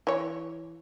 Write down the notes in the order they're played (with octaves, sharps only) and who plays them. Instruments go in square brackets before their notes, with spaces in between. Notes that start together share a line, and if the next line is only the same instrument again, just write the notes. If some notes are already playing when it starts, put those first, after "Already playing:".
[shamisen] E3 C#5